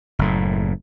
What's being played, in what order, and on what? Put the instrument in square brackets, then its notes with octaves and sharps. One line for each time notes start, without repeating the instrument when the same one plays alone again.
[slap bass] F#1 A2